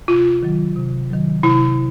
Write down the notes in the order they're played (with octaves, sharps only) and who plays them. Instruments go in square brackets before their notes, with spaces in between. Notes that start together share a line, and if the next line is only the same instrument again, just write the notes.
[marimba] C3 [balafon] F4
[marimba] D#3 F#3
C3
D#3 F#3
[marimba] C3 [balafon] E4